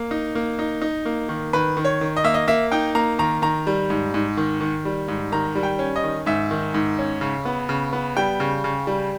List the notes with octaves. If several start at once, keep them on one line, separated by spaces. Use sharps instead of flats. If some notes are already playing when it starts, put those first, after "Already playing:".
Already playing: A#3
D#4
A#3
D#4
D#4
A#3
D#3
D#3 B4
D#3
C#5
D#3
D#5
A#3 E5
D#5
A#3 E5
D#4 G5
A#3 A#5
D#3 A#5
D#3 A#5
G3
G#2
G#2
D#3
D#3
G3
G#2
D#3 A#5
G3
G5
C#4
D#5
D#3
G#2 E5
D#3
G#2
C#4
C#3
B3
C#3
B3
G3 G5
C#3
C#3
G3